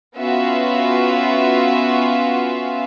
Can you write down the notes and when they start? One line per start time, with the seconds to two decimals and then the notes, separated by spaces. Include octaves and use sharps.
0.18 B3 C#4 F4 F#4 E5 F5